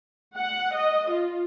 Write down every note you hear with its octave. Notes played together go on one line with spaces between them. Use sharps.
F#5
D#5
F4